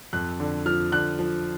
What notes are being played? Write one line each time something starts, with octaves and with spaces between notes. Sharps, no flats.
F2 F#6
D3
F3 F6
D3 F#6
F3